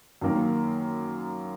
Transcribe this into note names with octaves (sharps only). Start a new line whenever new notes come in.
F#2 D#3 A#3